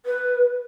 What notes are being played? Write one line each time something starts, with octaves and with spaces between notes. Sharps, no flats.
B4